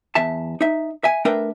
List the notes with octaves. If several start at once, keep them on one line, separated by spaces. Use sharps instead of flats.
E2 E5 A5
D#4 E5
E5 G#5
A3 D4 A#4 B4 E5 G5